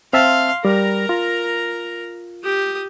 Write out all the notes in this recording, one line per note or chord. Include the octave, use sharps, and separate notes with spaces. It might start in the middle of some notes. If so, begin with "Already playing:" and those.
C4 E5 F5 A5 C6
G3 A#4 A#5
F4
G4 D#6